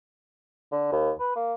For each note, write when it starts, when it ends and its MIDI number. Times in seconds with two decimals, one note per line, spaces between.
0.72 0.88 50
0.92 1.11 39
1.20 1.31 71
1.36 1.54 58